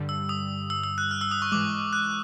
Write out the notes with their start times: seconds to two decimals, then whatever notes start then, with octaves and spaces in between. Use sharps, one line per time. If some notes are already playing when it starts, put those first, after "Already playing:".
Already playing: G2 D3 G3
0.09 E6
0.29 D#6
0.70 E6
0.84 E6
0.98 F#6
1.11 F6
1.21 E6
1.31 D#6
1.42 C#6
1.52 G#2 E3 G#3 D6
1.93 F#6